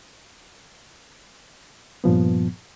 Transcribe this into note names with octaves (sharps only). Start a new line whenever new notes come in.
G2 A#2 F3 B3